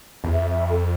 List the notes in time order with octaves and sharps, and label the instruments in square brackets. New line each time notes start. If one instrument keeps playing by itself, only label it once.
[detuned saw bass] E2
[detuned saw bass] F2 [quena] E5
[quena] E5
A4